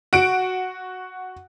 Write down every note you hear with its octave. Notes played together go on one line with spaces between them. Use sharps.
F#4 D7